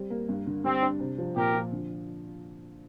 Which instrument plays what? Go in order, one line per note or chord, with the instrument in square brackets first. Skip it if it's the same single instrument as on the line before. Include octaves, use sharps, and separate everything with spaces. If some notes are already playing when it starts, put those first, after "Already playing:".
Already playing: [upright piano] G3 C4
A#3
G2
D3
[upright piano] G3 [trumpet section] C4
[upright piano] D4
C3
F3
[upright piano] A#2 [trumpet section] G4 A#4
[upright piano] F3
D3